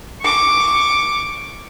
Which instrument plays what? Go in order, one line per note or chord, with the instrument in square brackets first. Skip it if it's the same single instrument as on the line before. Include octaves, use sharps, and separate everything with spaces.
[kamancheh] C#6 D6